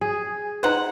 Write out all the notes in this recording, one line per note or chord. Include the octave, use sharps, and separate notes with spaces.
G#4
D#4 B4 C5 F#5